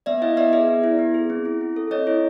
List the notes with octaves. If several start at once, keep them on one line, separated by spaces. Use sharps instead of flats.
B3 D5 E5
E4 D#5 F5
B3 D5 E5
G#4 D5 E5
B3
E4
B3
G#4
C4
E4
C4
A4
C4 C#5 D#5
E4